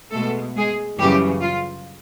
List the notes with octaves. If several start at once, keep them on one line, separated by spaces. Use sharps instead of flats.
B2 G#3 A3 B3 A4
G#3 G#4
F#2 C#3 E3 G3 G4
F4